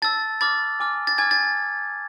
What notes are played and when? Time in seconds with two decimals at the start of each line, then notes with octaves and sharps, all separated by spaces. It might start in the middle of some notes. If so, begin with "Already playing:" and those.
0.02 A5 E6 A6
0.41 B5 D6 F6 A6
0.80 G#5 D6 F6
1.07 A6
1.18 G#5 D6 F6 G#6
1.31 A6